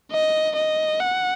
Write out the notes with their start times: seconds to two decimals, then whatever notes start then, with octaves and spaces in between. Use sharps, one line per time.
0.12 D#5
0.56 D#5
1.00 F#5